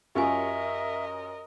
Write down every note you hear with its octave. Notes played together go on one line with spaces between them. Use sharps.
F#2 C#4 F4 G4 A#4 D#5 E5 G#5